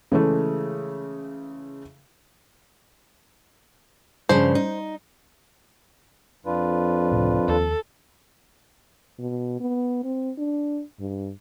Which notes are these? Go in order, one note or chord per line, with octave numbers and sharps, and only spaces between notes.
C#3 E3 G#3 A3
G2 C#3 F3 C5
D#4
F2 D4 F4 B4
C#2 A2 C3
D#2 A4
B2
B3
C4
D4
G2